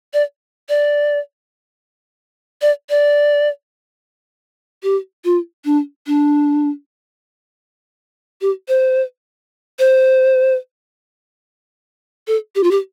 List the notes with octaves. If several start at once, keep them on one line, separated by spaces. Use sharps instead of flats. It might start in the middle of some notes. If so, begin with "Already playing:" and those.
D5
D5
D5
D5
G4
F4
D4
D4
G4
C5
C5
A4
G4
F4
G4